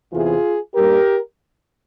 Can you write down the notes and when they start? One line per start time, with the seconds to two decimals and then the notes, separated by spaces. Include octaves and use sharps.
0.13 E2 C3 E3 F4 G#4
0.74 G2 G3 A#3 G4 A#4